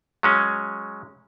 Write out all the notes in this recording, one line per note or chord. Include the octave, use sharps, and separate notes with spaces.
F#3 G#3 C#4